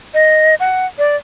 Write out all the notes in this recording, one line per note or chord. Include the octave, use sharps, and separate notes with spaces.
D#5
F#5
D5